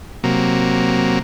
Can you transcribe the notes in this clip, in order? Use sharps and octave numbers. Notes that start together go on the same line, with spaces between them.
C3 F#3 A#3